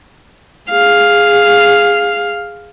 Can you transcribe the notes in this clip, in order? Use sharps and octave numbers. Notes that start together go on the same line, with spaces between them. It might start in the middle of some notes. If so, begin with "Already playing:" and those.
G#4 F5